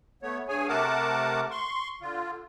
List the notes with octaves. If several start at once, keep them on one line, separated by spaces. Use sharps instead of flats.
A3 B3 C#5
G2 G#4 C#5 G#5
C3 A3 A#4 F#5 A5 D6
C6 C#6
D3 F4